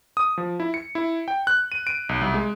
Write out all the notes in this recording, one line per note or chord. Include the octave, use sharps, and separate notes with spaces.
D#6
F3
E4
C#7
E4
G5
F#6
D#7
D7
B1
C2
G#3